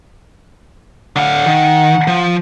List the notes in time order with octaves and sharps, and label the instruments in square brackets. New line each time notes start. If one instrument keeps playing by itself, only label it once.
[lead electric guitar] D3 F5 [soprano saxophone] F#5
[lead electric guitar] D#3
F3